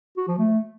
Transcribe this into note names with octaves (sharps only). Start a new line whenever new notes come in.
F#4
F3
A3